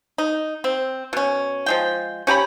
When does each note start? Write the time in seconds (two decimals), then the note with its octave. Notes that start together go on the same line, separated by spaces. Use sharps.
0.18 D#4
0.64 C4
1.13 B2 C#4
1.66 F3 G#3 G5
2.27 C#4 G4 A#5 B5